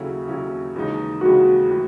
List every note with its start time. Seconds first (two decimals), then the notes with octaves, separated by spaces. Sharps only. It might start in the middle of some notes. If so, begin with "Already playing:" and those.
Already playing: D#2 C#3 F#3 C#4 E4 A4
0.28 D#2 C#3 F#3 C#4 E4
0.76 D#2 C#3 E3 G#3 D#4
1.21 D#2 C#3 E3 G#3 D#4 F#4
1.68 A2 E3